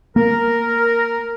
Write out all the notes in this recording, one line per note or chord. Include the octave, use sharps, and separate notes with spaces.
A#3 A#4